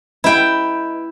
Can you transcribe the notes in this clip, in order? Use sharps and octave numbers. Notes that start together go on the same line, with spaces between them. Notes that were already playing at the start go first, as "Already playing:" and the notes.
E4 B4 D#5 G5 A#5